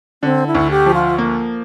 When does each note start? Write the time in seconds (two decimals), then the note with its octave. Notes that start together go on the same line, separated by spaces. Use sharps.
0.23 D3 C4
0.47 E4
0.55 D2
0.71 G4
0.86 F3
0.94 F4
1.18 A#3